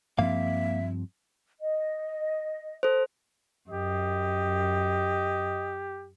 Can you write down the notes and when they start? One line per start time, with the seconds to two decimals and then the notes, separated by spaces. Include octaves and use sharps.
0.19 G2 F3 A#3 C4 E5 F5
1.60 D#5
2.83 A4 C5
3.69 F#2 G4 D#5